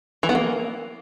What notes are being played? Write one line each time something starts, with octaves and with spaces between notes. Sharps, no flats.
E3
B3
A#3